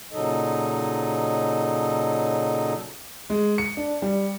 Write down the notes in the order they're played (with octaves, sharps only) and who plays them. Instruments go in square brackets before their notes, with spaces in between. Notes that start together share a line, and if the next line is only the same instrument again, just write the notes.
[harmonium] A#2 C#3 F#3 D#4 A4 D#5
[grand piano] G#3
C#7
D4
G3